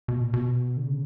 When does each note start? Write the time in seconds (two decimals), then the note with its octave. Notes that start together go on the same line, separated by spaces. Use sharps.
0.08 B2
0.21 A#2
0.34 B2
0.77 D3
0.87 C#3